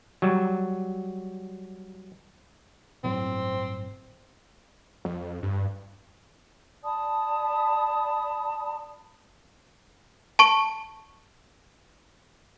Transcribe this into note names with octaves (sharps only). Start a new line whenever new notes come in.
F#3 G3
G1 A2 F#3 C4
F2
G2
D5 A5 B5 D#6
A5 C#6 D7